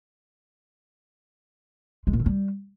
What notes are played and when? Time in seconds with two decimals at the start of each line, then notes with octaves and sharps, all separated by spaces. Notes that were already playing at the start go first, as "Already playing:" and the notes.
2.07 G#3
2.13 A#2
2.20 D3
2.26 G3